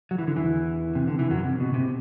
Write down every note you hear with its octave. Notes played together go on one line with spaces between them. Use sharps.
F#3
E3
D3
E2 E3
C3
D3
E3
F#2 F#3
C3
B2
C3